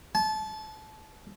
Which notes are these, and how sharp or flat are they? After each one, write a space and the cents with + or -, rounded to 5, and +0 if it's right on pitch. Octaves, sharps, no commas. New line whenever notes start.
A5 -25